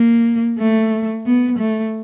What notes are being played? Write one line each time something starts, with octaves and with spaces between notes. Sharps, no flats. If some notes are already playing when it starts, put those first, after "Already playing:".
Already playing: A#3
A3
B3
A3